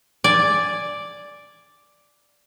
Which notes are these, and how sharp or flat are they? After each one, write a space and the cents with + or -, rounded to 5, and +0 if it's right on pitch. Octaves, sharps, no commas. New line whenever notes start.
D5 +0 G#5 +0